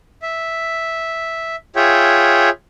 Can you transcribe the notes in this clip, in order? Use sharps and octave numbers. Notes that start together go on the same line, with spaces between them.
E5
F4 G#4 C#5 E5 G5